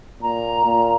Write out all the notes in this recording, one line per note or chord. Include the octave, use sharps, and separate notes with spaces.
A#2 A#5
A#2